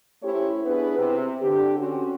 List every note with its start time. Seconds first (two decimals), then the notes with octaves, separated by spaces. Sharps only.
0.23 A3 C#4 E4 G4 C5 C#5
0.65 B3 D4 E4 G#4 B4
0.97 C3
1.41 D3 G4
1.78 C4 C#4 F#4